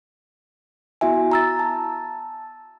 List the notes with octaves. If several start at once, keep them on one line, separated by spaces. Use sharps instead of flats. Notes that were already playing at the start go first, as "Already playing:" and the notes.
B3 E4 F#4 E5 G#5
A#5 E6 A6
A5